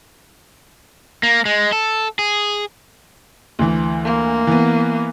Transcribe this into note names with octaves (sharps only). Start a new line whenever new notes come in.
A#3
G#3
A4
G#4
D2 E3
A#3
E3 B3